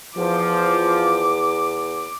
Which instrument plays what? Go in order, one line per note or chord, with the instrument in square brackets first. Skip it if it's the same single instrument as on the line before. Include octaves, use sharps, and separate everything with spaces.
[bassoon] E2 [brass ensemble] F3 [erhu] D6